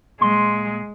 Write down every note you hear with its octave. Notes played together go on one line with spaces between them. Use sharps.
A#2 G#3 C6